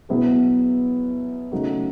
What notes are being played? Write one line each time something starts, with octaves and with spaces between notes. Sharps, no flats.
B2 F#3 B3 E4 G#4
C#3 F#3 A3 D#4 F#4